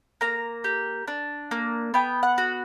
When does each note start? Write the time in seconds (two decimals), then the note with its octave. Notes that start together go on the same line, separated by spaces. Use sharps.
0.21 A#3 A#5
0.64 G4
1.08 D4
1.51 A#3
1.94 B3 G5
2.23 F#5
2.38 F#4